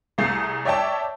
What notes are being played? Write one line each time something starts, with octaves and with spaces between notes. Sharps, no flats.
C2 A3 G#4 D#6 C7
C#5 D5 E5 G5 A5